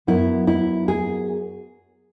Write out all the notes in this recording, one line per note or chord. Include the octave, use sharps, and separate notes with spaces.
F#2 F#3 B3 E4
E4
G#4